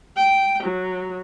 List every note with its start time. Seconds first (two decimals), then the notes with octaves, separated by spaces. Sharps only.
0.17 G5
0.62 F#3